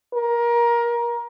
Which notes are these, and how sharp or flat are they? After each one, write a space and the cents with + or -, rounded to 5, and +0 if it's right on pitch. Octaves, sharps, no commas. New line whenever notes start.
A#4 +25